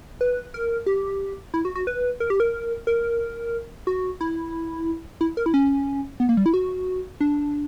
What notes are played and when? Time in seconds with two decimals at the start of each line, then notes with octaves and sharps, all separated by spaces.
0.21 B4
0.54 A#4
0.86 G4
1.54 E4
1.65 F#4
1.75 F#4
1.87 B4
2.20 A#4
2.30 G4
2.40 A#4
2.87 A#4
3.87 F#4
4.21 E4
5.21 E4
5.37 A#4
5.46 E4
5.54 C#4
6.20 B3
6.29 A#3
6.37 G3
6.46 E4
6.54 F#4
7.21 D4